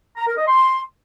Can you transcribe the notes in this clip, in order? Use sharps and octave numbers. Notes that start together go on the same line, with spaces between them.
A#5
A#4
D#5
C6